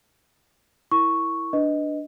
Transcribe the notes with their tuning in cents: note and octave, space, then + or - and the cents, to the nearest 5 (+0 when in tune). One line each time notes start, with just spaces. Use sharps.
E4 +0 A#4 +0 C#6 +0
D4 +0 B4 +0 D#5 +0